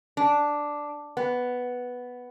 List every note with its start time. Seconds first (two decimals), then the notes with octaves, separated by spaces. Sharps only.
0.17 D4
1.17 B3